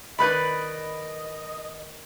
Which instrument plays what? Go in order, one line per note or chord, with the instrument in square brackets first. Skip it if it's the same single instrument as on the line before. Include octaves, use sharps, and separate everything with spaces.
[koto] D#3 B4 D5 [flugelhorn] D#5 [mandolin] B5 F#6